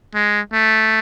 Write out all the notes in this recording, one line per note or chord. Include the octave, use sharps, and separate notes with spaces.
G#3
A3